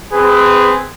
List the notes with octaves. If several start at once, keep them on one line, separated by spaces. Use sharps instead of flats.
C4 G#4 B4